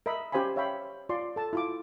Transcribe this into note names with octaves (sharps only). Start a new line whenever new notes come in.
A#4 D#5 E5 B5
C#4 G4 C5 F5 G#5 B5
C#5 E5 F5 G5 B5
F4 D5 C6
A4 A5
E4 F4 D6